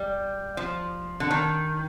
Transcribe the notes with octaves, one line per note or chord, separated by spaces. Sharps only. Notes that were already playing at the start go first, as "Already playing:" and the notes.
Already playing: G3
F3
D3
D#3